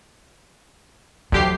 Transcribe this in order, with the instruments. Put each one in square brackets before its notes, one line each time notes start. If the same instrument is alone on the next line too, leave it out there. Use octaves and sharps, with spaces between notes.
[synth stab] D2 G4 C7 [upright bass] F#3